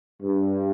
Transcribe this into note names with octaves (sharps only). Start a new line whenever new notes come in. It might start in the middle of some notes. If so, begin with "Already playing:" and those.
G2